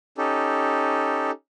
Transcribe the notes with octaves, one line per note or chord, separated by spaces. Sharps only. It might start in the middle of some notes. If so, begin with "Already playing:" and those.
C#4 D#4 G4 A4